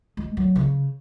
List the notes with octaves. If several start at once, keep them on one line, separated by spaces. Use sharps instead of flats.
G#3
F#3
C#3